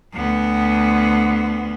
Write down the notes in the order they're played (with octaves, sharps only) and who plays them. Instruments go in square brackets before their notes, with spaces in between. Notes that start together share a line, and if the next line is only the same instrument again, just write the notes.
[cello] D2 B3